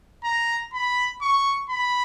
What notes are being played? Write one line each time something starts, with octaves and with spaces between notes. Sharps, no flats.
A#5
B5
C#6
B5